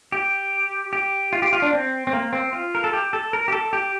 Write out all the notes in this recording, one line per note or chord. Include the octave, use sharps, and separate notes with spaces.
G4
G4
F4
G4
F4
D4
C4
C4
A#3
C4
F4
A#4
A4
G4
A4
A#4
G4
A4
G4